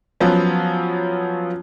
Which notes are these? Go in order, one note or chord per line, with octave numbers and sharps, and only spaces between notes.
F3 F#3 B3 C#4